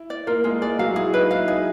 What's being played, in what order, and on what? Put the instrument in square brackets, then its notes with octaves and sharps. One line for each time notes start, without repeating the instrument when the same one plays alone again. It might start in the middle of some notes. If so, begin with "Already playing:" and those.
Already playing: [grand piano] E4
[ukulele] D5
[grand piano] A#3 A#4 [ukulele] F4
[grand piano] G#3 G#4 [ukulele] F4
[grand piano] G#3 G#4 [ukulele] D5
[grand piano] F#3 F#4 [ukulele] F5
[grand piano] E4 [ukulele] G#4
[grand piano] D#4 [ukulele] B4
[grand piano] E4 [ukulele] F5
[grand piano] D#4 [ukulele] G#4